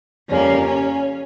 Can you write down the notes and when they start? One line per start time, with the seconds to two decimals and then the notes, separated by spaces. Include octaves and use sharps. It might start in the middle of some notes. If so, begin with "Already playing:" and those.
0.28 F2 C#3 G3 A#3 C#4
0.65 C#4